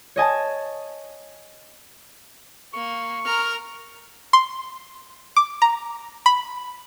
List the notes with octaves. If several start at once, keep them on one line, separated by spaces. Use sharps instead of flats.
C#5 D#5 G#5 A5
A#3 C#6
A#4 A#5 F6
C6
D6
A#5
B5